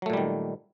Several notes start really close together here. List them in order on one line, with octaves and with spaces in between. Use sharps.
F#3 A3 A#2 G3 D#3